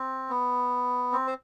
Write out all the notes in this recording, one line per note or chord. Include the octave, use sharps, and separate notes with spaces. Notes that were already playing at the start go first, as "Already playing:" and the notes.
Already playing: C4
B3
C4
C5